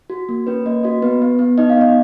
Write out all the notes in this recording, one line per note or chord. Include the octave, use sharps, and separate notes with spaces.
F#4
A#3
C#4 B4
A#3 D#5
F#4 D#5
B3 B4
B3
B3
D#4 D#5
F5
B3 D#5